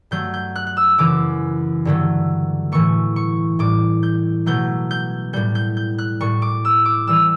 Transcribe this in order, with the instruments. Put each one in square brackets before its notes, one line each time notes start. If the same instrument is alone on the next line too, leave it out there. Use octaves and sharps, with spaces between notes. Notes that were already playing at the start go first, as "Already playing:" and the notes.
[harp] G2 F#3 A3 G6
G6
F#6
F#6
E6
F#2 C#3 E3 D6
G2 D3 F#3 A3
A2 E3 A3 C#6
C#6
A2 G3 D6
G6
B2 F#3 A3 G6
G6
A2 G3 G6
G6
G6
F#6
A2 G3 C#6
D6
E6
D6
E3 G3 E6